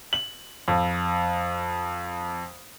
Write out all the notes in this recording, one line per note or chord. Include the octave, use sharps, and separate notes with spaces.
F#7
F2